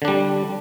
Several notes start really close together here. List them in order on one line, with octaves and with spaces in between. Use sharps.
D3 D4 G3